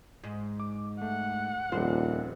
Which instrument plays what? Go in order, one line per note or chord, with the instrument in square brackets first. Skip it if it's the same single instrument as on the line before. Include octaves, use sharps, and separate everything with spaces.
[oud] G#2
[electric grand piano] D6
[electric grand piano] A3 [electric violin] F#5
[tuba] D#1 [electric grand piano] F2 A#2 [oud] C5